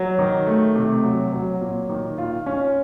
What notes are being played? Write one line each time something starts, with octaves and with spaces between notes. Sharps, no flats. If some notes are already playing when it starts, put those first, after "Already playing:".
Already playing: F#3
D#3
A3
C3
F#3
F#3
A#2
D#3
F4
C#4